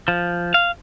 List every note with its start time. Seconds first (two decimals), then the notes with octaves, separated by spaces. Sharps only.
0.08 F3
0.54 F5